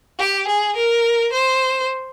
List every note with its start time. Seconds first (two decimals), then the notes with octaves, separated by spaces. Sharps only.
0.19 G4
0.48 G#4
0.76 A#4
1.32 C5